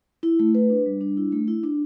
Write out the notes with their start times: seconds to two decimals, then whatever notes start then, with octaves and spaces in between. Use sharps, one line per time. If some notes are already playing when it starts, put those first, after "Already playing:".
0.23 E4
0.39 A3
0.55 B4
0.70 D4
0.86 G3
1.01 D4
1.17 E4
1.32 A3
1.48 E4
1.63 D4